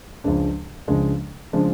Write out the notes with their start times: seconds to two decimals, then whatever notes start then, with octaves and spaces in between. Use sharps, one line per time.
0.24 C#2 C#3 F3 G#3 D4
0.88 C#2 C#3 F3 G#3 D4
1.53 C#3 F3 G#3 D4